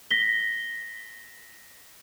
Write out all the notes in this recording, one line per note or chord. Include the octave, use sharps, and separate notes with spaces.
A#6 B6 G7